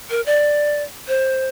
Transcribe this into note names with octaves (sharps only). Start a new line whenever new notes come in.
A#4
D5
C5